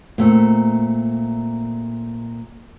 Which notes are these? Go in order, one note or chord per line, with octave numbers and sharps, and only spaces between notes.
A#2 A3 C4